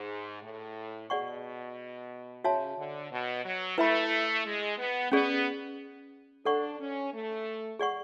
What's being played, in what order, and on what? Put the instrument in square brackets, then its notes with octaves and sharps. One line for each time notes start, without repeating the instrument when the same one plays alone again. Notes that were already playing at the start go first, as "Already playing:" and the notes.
Already playing: [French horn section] G#2 [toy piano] G#4
[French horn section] A2
[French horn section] B2 [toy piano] G#4 D5 F#5 C#6
[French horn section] C#3 [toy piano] F#4 C#5 E5 A5
[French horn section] D3
B2
F#3
[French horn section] A3 [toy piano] E4 B4 E5 B5
[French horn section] G#3
B3
[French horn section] B3 [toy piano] C#4 G#4 D5
[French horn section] D4 [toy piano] A4 D5 F#5 C#6
[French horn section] C#4
A3
[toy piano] G#4 D5 F#5 C#6